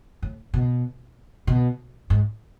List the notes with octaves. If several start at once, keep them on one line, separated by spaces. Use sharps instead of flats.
A2
B2
B2
G#2